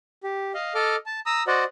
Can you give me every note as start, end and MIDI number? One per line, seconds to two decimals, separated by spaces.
0.23 0.52 67
0.54 0.74 75
0.54 0.74 77
0.75 0.96 69
0.75 0.96 75
0.75 0.96 86
0.75 0.96 89
1.06 1.20 81
1.26 1.43 82
1.26 1.43 87
1.26 1.43 88
1.47 1.64 66
1.47 1.64 72
1.47 1.64 74
1.47 1.64 75
1.47 1.64 78